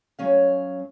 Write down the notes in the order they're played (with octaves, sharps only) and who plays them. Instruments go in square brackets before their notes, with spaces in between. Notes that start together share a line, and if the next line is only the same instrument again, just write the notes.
[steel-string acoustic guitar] F#2 F#3 C#4 F5